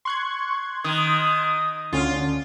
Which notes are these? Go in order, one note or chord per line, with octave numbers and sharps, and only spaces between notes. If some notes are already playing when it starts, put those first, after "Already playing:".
C6 C#6 F#6 G#6
D#3 D#6
D2 D3 C#4 F4